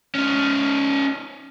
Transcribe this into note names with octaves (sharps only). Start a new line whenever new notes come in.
C#4 D#4